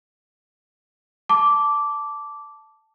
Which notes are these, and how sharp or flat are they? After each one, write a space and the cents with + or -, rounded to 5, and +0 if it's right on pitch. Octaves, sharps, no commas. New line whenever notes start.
A5 +0 D6 -10